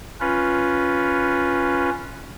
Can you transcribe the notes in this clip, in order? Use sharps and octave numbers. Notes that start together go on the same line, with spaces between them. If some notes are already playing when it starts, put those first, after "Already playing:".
C#4 F4 B4